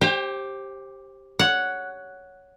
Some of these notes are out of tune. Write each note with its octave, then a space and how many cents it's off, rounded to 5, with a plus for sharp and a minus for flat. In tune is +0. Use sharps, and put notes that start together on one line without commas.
G4 +0 C5 +25 G5 +40
C#5 +10 F#5 +0